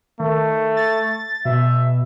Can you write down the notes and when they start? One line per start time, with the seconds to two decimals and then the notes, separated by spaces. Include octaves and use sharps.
0.20 D#3 A3
0.77 A6
1.45 B2 E5